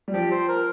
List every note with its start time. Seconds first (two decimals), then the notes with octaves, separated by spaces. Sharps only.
0.08 G3
0.13 F3 G4
0.31 C5
0.49 A#4